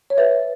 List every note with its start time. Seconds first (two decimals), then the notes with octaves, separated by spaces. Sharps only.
0.10 C#5
0.17 B4 E5